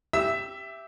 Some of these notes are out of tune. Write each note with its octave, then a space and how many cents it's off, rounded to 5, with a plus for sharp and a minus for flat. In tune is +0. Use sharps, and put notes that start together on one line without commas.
G4 +0 E5 +15 E6 -10